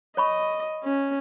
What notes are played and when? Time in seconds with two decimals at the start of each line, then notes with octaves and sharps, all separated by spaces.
0.17 C#5 D#5 B5 C#6
0.84 C#4